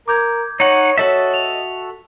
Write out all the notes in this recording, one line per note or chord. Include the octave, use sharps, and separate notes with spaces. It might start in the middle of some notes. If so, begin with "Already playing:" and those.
A#4 D6 G6 G#6
D#4 C#5 F#5
F#4 A4 C#5 D#5 E5
F7